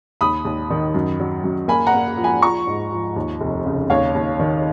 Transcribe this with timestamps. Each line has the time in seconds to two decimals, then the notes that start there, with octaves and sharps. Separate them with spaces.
0.21 D#2 B5 D#6
0.45 D#2
0.70 D#3
0.94 F#2
1.20 F#3
1.44 F#2
1.68 A#3 G#5 B5
1.87 F#5 A#5
1.93 A#3
2.17 F3
2.24 G#5 B5
2.42 F3 A#5 C#6
2.67 G#2
2.92 F3
3.16 D#2
3.40 F1
3.66 C#3
3.90 D#2 C#5 F5
4.15 D#2
4.39 D#3